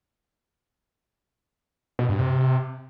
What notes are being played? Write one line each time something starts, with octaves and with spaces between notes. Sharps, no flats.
B2
G2
C3